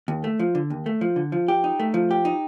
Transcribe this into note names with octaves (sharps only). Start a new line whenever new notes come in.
D#2
A3
F3
D3
D#2
A3
F3
D3
F3
G4
D#4
A3
F3
G4
D#4